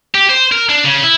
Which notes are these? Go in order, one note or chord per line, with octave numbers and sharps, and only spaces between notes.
G4
C5
A#4
D4
C#3
E4